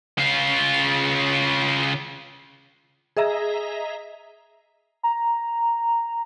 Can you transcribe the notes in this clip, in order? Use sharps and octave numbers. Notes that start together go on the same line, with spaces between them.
C#3 F4
G#4 D#5 E5 A#5
A#5